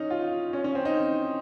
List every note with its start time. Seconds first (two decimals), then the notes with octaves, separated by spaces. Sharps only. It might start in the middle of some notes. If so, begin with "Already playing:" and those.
Already playing: C#4 D#4
0.10 F4
0.53 C#4
0.64 C#4
0.75 C4
0.85 D#4